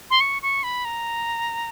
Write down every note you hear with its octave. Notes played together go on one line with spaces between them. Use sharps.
C6
C#6
C#6
B5
A#5